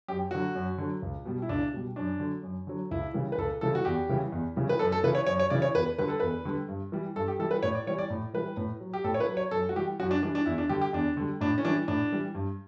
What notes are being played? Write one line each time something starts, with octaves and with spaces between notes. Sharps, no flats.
F#2 G4
D3 F#3 F#4
F#2
D3 F#3
C#2
B2 G3
E4
C#2 D4
B2 G3
F#2 D4
D3 F#3
F#2
D3 F#3
C#2 E4
C#3 E3 G3
B4
C#2 A4
C#3 E3 G3 A4
F#4
E2 G4
C#3 E3 G3
E2
C#3 E3 G3
B4
F#2 A4
A4
C#3 E3 B4
C#5
F#2 C#5
C#5
C#3 E3 D5
C#5
E2 B4
D3 G3 B4
A4
E2 B4
D3 G3
G2
E3 G3
G2 A4
G4
E3 G3 A4
B4
A2 C#5
D5
E3 G3 C#5
D5
A2
E3 G3 B4
A2
F#3
G4
A2 A4
C#5
B4
F#3
C#5
F#2 A4
F#4
E3 G3 G4
F#2 F#4
D4
E3 G3 D4
D4
E2 E4
D4
D3 G3 G4
G4
E2 D4
D3 G3
A2 D4
C#4
E3 G3 D4
A2 D4
E3 G3
G2